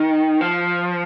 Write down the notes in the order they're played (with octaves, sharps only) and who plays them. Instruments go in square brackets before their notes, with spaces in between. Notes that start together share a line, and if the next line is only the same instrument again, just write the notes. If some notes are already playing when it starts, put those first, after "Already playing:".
Already playing: [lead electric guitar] D#3
F3